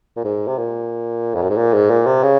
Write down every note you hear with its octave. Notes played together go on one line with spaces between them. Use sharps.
A#2
G#2
C3
A#2
F2
F#2
G#2
A#2
G#2
A#2
C3
C#3